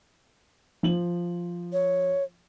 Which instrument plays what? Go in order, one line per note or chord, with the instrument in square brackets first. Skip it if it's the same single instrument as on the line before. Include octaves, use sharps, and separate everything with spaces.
[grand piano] F3 F#7
[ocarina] C#5